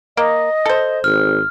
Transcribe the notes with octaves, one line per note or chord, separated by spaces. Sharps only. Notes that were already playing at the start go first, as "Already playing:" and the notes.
A#3 D#5
A4 C5
G#1 F6